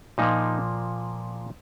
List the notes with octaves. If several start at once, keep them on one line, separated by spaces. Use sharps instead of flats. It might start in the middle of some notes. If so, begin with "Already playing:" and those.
A#2 F3 A#3 D#4